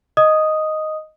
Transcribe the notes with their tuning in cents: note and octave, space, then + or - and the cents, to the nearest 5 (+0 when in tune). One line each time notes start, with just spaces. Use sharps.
D#5 +0 D#6 +0